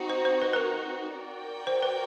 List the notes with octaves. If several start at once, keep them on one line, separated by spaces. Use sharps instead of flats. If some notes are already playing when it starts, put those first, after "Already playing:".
Already playing: C4 D#4 F#4
C5
C5
B4
B4
A#4
F#4 A#4 D5 G5
C5
B4